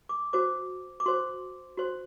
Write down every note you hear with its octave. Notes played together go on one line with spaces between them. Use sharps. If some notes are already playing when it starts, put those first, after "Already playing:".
D6
F#4 C5 D6
D6
F#4 C5 C6
F#4 C5 C6